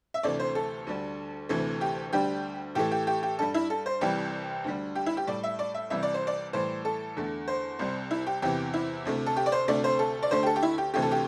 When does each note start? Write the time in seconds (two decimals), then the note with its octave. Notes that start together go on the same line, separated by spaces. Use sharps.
0.14 E5
0.23 D2 C3 E3 A3 D5
0.39 C5
0.55 A4
0.87 D2 D3 G3
1.49 D2 C3 E3 A3
1.81 G4
2.13 D2 D3 G3 G4
2.75 A2 E3 A3 G4
2.91 G4
3.07 G4
3.23 G4
3.39 G2 G3 A4
3.54 E4
3.70 A4
3.86 C5
4.01 C2 C3 E3 G3 G4
4.64 D2 D3 G3
4.95 G4
5.06 E4
5.17 G4
5.27 A2 G3 D5
5.43 E5
5.59 D5
5.74 E5
5.90 C2 C3 E3 G3 E5
6.03 D5
6.14 C5
6.27 D5
6.53 A2 E3 G3 C5
6.85 A4
7.17 E2 D3 A3
7.48 C5
7.79 C2 C3 G3
8.11 E4
8.27 G4
8.42 E2 C3 E3 G4
8.74 E4
9.05 D2 C3 A3
9.26 A4
9.36 G4
9.46 D5
9.52 C5
9.68 D2 C3 A3 D5
9.84 C5
9.99 A4
10.23 D5
10.31 D2 D3 A3 C5
10.43 G4
10.47 A4
10.56 G4
10.63 E4
10.78 G4
10.94 D2 C3 E3 A3 G4
11.02 A4
11.12 G4